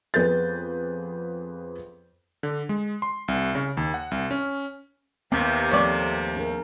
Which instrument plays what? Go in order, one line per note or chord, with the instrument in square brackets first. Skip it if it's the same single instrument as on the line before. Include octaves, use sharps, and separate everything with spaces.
[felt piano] F2 B3 G#4 B4 G6 A6
[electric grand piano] D3
G#3
C6
C2
C#3
D#2
F#5
C2
C#4
[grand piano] D#2 [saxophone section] C3 [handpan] B3
[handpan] F3 A3 C4 [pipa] C#5 D5
[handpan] D4 G#4 A#4